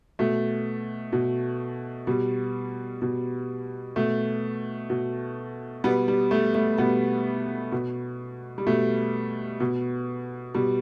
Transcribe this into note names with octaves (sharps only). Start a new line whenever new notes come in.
B2 A3
B2
B2 G3
B2
B2 A3
B2
B2 G3 B3
G3
A3
A3
B2 G3 B3
B2
G3
B2 A3
B2
B2 G3